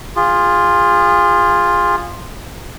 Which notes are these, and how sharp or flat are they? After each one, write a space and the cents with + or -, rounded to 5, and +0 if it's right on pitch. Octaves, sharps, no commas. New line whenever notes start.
F4 +5 G#4 -30